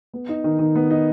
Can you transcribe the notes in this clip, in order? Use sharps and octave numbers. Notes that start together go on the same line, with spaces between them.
B3
D#4
D#3
D#3
B3
D#4